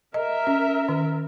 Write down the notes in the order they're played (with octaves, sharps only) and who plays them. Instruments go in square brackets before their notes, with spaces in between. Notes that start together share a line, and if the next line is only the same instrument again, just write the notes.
[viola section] A#4 E5 [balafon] D#5
[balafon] C#4
D#3